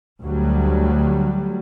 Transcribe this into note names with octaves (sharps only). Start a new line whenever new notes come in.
D2 F#3 G3